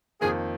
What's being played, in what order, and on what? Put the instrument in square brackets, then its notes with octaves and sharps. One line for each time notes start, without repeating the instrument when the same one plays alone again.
[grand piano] F2 D#3 A#3 [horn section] G#4